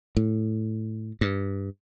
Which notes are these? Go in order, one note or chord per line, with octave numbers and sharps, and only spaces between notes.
A2
G2